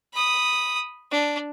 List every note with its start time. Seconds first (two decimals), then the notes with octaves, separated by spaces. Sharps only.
0.14 B5 D#6
1.11 D4